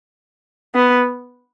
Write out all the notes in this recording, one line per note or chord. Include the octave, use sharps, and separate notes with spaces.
B3